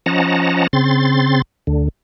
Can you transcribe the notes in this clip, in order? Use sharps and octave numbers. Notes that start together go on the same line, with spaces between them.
F3 C#4 D#5 F#5 A5 A#5
C#3 C4 C6 A6
D2 D3